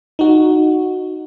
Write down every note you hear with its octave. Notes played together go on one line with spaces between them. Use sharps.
D#4 F#4